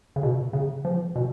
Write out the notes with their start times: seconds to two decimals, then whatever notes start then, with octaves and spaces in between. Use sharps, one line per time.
0.16 C#3
0.23 B2
0.53 C#3
0.85 F3
1.16 B2